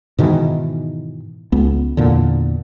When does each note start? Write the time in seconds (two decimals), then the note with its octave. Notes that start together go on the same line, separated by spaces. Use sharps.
0.19 G#2 B2 D#3 E3
1.52 C#2 B3
1.97 E2 A#2 D3